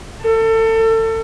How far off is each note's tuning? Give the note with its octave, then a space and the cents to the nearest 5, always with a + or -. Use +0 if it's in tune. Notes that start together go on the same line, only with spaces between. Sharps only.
A4 +30